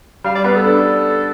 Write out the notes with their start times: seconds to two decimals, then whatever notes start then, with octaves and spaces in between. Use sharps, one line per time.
0.24 G3 F5
0.35 D5
0.44 B3 B4
0.54 A4
0.64 D4